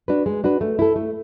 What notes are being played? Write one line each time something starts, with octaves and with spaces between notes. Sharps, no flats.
D4 F#4 B4
G#3
D4 F#4 B4
A3
E4 A4
A3